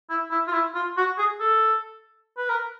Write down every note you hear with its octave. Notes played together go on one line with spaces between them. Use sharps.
E4
E4
F4
E4
F4
F#4
G#4
A4
B4
A#4